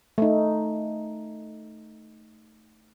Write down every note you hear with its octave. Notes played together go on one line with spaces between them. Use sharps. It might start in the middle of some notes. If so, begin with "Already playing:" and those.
A3 D#4